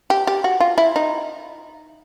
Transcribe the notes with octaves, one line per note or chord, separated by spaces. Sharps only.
G4
G4
F#4
F4
E4
D#4